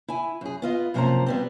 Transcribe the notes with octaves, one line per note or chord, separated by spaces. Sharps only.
E4 G#5
F#2 G#4
B3 F4 D#5
F#2 C3 F3 A#3 C5 A#5
G3 B3 C4